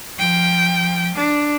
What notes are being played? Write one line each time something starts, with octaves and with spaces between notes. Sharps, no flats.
F3 G5
D4